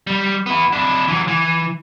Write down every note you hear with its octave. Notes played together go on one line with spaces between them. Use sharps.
G3
B3 E4
D4 E4
E3 F#3
E3